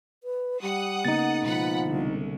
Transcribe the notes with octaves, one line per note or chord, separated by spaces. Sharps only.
B4
G3 F#5 D#6
C#3 A#3 B3 D#4 A6
B2 F3 G#3 B4 F#5 B5
C2 D3